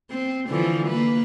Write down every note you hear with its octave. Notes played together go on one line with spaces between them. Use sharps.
C4
D3 E3 F3
A#3 B4